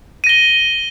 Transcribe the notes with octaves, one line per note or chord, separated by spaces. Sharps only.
A#6 D#7 G7